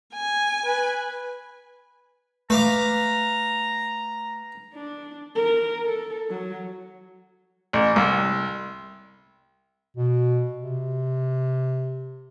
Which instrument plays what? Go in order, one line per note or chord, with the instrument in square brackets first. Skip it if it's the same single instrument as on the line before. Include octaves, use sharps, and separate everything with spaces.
[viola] G#5
[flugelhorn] B4
[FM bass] A3 [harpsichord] B4 F5 D6 [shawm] A#5
[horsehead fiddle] D4
A#4
A4
F#3
[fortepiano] A1
C2
[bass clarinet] B2
C3